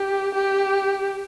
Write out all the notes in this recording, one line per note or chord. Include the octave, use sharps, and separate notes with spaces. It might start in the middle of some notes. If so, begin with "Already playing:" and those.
Already playing: G4
G4